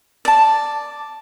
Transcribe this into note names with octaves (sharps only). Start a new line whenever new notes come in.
D5 A5